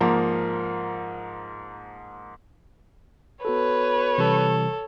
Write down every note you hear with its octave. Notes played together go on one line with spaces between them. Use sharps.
G#2 F3 A#3 A#4 A#5
B3 F#4 A4 B4 C#5
C3 E3 G3 A4